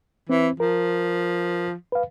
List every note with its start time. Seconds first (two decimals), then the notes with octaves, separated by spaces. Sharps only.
0.29 E3 C4
0.60 F3 A#4
1.92 B4 F5